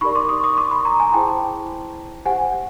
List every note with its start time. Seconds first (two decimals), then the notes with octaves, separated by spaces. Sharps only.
0.01 D#4 G4 A#4 D5 B5 C#6
0.15 C6 D6
0.29 C#6 D#6
0.44 C#6 D#6
0.57 C6 D6
0.71 B5 C#6
0.85 A#5 C6
1.00 G#5 A#5
1.14 E4 G#4 C5 G5 A5
2.25 G4 C5 F#5 G#5